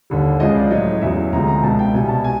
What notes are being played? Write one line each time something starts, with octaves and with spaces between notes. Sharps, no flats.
D#2 D3 G3
C#2 C#3 F3 G#3 D#5
D5
A2 F#3 D#5
E2 C#3 F#3 E5
D2 C3 F3 G#3 A#5
A#5
C#2 B2 G#3 A5
G5
C2 B2 G3 G#5
A5
G#5